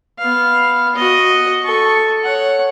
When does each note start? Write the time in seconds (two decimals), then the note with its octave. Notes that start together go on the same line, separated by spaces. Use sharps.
0.19 B3 F5
0.95 F#4 D#5
1.63 A4 C#6
2.24 C#5 F#5